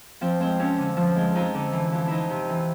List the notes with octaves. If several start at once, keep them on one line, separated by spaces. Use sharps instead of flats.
F3 C4
G#3 C4
F2 C#4
D3
F3
G#3
F2 D#4
D3
E3
F2
F2 D#4 E4
C3
E3